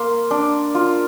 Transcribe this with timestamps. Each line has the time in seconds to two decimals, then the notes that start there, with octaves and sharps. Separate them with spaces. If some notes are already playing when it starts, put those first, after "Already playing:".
Already playing: A#3 C6
0.31 D4
0.75 F4